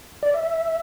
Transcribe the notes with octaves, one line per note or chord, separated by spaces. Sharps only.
D5
E5